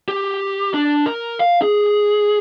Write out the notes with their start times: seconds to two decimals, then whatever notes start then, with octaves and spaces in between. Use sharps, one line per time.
0.08 G4
0.74 D4
1.06 A#4
1.40 F5
1.62 G#4